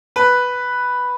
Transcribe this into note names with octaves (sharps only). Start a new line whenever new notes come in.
B4